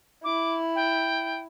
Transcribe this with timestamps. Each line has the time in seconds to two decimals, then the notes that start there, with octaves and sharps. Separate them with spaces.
0.24 E4 D6
0.75 G5